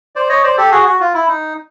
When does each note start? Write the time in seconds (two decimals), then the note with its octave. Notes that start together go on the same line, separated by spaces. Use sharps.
0.16 C5 D5
0.29 C#5 D#5
0.43 C5 D5
0.58 G4 A4
0.72 F#4 G#4
0.87 F#4
1.00 F4
1.14 E4
1.28 D#4